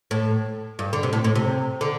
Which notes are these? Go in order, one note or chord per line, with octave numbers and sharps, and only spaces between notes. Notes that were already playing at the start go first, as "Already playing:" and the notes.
A2
G2
D3
C3
A2
A2
C3
D3